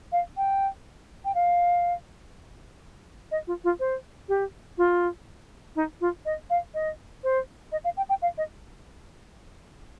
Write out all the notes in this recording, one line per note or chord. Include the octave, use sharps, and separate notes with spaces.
F5
G5
G5
F5
D#5
F4
F4
C5
G4
F4
D#4
F4
D#5
F5
D#5
C5
D#5
F5
G5
G5
F5
D#5